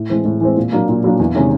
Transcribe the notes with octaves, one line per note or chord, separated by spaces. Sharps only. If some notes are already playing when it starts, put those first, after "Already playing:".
Already playing: A2
E3 G#3 C4
A2
E3 G#3 C4
A#2
F#3 A#3 D4
A#2
F#3 A#3 D4
E2
C3 D#3 G#3 C#4